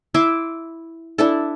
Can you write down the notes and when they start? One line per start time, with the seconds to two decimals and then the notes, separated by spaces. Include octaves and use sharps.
0.14 E4 E5 C6 D6
1.18 D4 E4 A4